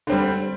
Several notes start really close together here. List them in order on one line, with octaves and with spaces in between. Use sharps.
D3 C4 G3